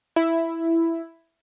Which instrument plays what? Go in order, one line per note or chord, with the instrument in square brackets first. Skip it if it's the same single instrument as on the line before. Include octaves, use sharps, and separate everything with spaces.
[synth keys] E4